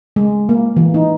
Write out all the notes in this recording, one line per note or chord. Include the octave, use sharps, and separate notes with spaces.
G#3
A#3
E3
D#4